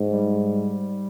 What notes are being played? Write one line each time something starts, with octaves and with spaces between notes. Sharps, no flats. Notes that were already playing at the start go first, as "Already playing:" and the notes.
Already playing: G#2
G3